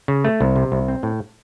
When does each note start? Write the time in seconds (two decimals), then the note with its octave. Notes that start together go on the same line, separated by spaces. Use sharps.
0.08 C#3
0.24 A3
0.41 C2
0.56 C3
0.72 C2
0.88 C4
1.03 A2